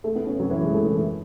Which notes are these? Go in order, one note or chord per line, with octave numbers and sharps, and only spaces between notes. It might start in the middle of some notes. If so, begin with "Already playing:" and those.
A3
B3
C#4
F#3
E3
G#3
A3
E3